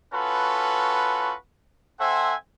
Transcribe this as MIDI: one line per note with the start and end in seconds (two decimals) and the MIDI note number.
0.14 1.34 61
0.14 1.34 65
0.14 1.34 66
0.14 1.34 69
0.14 1.34 71
2.00 2.35 60
2.00 2.35 69
2.00 2.35 72
2.00 2.35 76
2.00 2.35 78
2.00 2.35 80